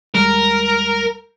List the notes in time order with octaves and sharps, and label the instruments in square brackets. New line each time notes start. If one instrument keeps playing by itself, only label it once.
[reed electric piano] D#2 G3 G#3 [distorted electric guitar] A#4